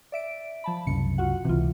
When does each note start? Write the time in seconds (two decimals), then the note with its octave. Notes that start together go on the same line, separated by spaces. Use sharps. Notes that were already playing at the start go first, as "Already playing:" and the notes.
0.12 D5 E5 D7
0.64 F3 A5 B5
0.87 C2 F#2 C#3 C#7
1.18 F4 F#4 F#5
1.45 C#2 C3 E3 F4